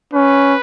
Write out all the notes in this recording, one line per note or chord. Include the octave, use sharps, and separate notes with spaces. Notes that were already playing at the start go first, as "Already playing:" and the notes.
C#4 B4